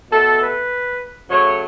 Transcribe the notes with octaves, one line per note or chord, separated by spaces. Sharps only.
B2 A3 A4
B4
C#3 F#3 A3 C#5